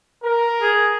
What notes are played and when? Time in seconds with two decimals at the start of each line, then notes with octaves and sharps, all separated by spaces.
0.24 A#4
0.62 G#4